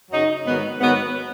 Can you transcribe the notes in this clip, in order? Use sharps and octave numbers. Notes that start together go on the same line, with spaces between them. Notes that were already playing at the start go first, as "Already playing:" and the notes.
F#2 C#3 F#3 D#4
G#2 D#3 F#3 B3
G#2 D#3 F#3 B3